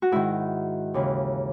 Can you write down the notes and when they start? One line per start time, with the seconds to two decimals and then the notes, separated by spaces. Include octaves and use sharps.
0.02 F#4
0.12 G#2 D#3 E4
0.94 D#2 C#3 E3